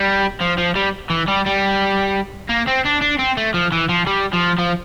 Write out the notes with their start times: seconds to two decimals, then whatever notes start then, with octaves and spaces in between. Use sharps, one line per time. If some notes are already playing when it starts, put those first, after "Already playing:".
Already playing: G3
0.41 F3
0.58 F3
0.76 G3
1.10 E3
1.28 G3
1.46 G3
2.49 A#3
2.68 C4
2.85 D4
3.02 D4
3.19 C4
3.37 A3
3.54 F3
3.72 E3
3.89 F3
4.07 G3
4.33 F3
4.59 F3